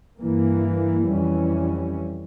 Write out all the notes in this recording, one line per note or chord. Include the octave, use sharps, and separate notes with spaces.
G2 E3 A#3
F2 E3 G3 C#4